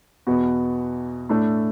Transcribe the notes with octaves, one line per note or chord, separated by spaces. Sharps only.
E2 B2 B3 F#4
A2 A3 D4